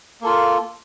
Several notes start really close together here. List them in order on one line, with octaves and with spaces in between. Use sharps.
A#3 A4 F4